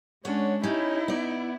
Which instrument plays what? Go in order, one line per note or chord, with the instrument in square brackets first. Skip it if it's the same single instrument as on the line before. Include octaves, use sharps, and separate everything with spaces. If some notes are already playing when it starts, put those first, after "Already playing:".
[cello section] G#3 [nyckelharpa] C#4 D4 [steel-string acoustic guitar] C#5 F#5
[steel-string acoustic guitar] C#4 G4 [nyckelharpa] D#4 [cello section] E4
[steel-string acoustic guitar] B3 D5